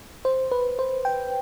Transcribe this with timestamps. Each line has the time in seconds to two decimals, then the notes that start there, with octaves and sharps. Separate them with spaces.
0.25 C5
0.51 B4
0.79 C5
1.05 G5